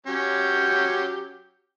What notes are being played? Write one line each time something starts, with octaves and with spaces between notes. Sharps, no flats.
F#3 C#4 G4